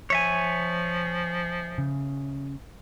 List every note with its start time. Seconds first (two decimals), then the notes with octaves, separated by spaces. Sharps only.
0.10 F3 C#5 E5 G#5
1.78 C#3